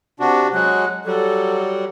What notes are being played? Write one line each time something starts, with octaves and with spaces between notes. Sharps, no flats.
C3 D4 F#4
F#3 G#3 F#6
F#3 G3 A4